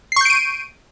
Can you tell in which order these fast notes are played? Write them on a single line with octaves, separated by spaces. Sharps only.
C7 C#6 G6 D7 D#7